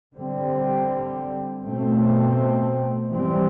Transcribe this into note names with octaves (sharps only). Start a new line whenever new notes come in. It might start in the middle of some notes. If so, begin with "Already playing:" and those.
D3 G3 C4
B2 A3 C4
E3 G3 C4